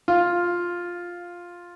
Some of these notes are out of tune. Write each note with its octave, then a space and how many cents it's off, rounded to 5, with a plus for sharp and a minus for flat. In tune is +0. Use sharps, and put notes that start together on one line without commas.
F4 +5